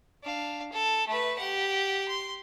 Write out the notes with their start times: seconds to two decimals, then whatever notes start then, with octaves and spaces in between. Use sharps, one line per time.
0.23 D4 F5
0.72 A4
1.08 A3 B4
1.39 G4 F#5
2.08 C6